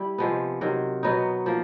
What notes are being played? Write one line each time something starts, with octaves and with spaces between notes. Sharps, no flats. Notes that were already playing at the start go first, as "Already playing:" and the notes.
Already playing: G3 E4
C3 F3 G#3 B3
C3 D#3 F#3
B2 F#3 B3 D#4
F3 A#3